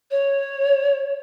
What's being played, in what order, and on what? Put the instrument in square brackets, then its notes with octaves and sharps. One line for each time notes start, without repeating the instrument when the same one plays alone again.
[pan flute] C#5